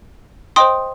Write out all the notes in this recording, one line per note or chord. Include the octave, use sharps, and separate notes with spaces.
C5 D#5 G5 C6 D#6